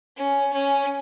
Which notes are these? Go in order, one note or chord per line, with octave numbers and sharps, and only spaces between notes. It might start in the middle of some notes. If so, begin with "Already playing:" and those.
C#4
C#4